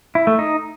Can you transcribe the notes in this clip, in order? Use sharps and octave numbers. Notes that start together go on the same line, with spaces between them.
E4
A3
D#4